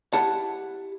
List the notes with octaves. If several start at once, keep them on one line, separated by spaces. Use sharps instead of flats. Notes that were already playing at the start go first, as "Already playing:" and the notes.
E4 G4 F#5 A5